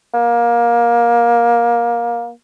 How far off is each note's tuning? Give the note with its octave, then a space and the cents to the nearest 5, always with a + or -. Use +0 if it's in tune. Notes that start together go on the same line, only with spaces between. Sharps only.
A#3 +20